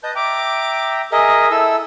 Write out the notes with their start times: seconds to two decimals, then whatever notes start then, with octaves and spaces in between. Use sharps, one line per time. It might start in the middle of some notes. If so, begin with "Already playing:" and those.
0.03 B4 D#5 A5 G6
0.15 E5 G5 A#5 D6
1.12 G#4 A#4 D#5 E5
1.51 E4 A4 E6